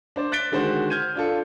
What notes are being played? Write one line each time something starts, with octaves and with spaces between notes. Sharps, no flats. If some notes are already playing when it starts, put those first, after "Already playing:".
D4 C5 D5
F#6 A6 B6 D7 G7
D3 D#3 G#3 F#4 C5
F6 G6 G#6 D#7
D4 F4 A4